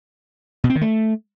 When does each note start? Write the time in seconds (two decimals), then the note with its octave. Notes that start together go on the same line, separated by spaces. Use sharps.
0.64 B2
0.70 C4
0.76 D#3
0.81 A3